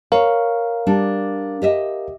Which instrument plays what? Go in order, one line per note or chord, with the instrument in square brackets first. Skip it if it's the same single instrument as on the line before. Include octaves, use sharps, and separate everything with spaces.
[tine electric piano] A#4 F5 [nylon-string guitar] C#5
[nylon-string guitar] G3 D4
G4 D#5 E5